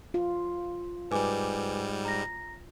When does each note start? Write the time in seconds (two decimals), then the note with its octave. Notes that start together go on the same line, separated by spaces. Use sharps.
0.14 F4
1.11 G#2 G3 B4 G#5 D6
2.05 A#5 A#6